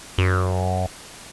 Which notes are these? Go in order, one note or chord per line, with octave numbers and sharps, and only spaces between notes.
F#2